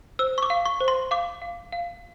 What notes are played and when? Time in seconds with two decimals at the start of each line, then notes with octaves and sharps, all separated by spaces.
0.19 C5 E6
0.38 C#6
0.43 D6
0.50 F5
0.66 C#6
0.80 C5
0.88 C6
1.11 F5 D6
1.42 F5
1.72 F5